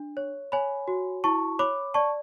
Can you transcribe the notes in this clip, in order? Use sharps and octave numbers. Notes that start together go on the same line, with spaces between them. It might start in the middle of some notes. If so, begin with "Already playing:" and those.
Already playing: D4
C#5
C#5 G#5 B5
F#4
E4 A5 C#6
C#5 B5 D6
D5 A5 C#6